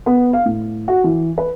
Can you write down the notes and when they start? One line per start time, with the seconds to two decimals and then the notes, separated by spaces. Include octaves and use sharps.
0.06 B3
0.33 F5
0.45 A2
0.88 F#4
1.04 E3
1.38 B4